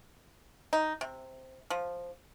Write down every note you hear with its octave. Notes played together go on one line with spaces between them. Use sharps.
D#4
C3
F3